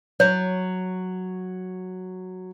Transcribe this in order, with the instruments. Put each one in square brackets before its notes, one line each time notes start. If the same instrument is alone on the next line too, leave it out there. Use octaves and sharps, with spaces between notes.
[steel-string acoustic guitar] F#3 [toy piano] C#5